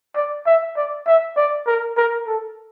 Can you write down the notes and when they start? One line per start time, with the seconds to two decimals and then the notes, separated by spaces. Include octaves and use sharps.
0.16 D5
0.46 E5
0.76 D5
1.07 E5
1.36 D5
1.66 A#4
1.97 A#4
2.27 A4